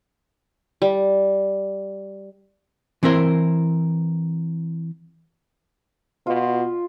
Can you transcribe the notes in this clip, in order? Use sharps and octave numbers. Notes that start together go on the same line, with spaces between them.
G3
E3 C4 E4 A#4 C5
B2 F4